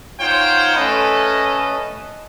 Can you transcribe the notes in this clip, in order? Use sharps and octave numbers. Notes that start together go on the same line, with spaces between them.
D#4 F4 C5 C#5 F#5 G5
A3 C#4 A4 B4 D#5